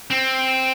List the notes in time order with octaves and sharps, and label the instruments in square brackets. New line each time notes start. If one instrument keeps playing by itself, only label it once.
[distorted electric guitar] C4